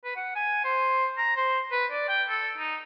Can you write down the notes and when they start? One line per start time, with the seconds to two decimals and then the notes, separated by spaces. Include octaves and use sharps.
0.04 B4
0.16 F#5
0.35 G#5
0.64 C5
1.18 A#5
1.37 C5
1.72 B4
1.92 D5
2.08 G5
2.29 A4
2.58 D#4